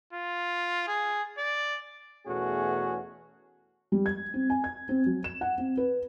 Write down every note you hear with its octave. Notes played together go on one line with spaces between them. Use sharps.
F4
G#4
D5
E2 B2 A3 C#4 F#4 G#4
G3
G#6
C4
G#5
G#6
C4
F#3
E7
F#5
C4
B4